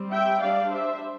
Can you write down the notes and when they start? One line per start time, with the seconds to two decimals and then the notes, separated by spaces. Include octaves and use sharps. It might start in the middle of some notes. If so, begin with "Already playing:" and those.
Already playing: G3 C4
0.12 E5 G5
0.41 G3 D4 D5 F5
0.71 C5 E5